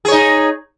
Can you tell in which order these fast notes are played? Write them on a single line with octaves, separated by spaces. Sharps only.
G#4 C#5 D#4